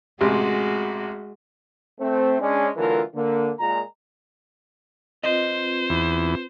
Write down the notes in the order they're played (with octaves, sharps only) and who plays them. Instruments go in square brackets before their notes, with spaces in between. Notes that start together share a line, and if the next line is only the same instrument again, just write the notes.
[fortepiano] A1 C3 [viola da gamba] G#3 F#4
[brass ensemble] A3 C4
G#3 C#4 D4
D3 E3 F#3 A3 F4 A#4
D3 A#3
A#2 G#3 A#5
[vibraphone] C4 F4 B4 [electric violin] C5 [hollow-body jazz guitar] D#5
[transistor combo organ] E2